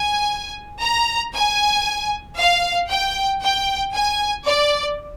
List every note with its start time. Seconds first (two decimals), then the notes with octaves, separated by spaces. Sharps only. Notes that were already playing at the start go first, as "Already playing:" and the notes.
Already playing: G#5
0.82 A#5
1.34 G#5
2.38 F5
2.91 G5
3.42 G5
3.94 G#5
4.46 D5